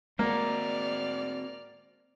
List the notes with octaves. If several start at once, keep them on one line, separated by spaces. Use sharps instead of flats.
G#3 A#3 C4 F#4 D5 F6